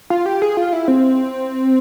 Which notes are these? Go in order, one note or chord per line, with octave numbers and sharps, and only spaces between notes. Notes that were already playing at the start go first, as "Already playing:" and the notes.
F4
G4
G#4
F4
E4
C4